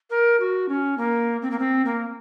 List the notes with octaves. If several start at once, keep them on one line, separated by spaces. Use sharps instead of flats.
A#4
F#4
C#4
A#3
C4
A#3
C4
A#3